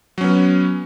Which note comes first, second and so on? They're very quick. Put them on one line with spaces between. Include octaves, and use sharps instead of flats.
F#3 C#4 B3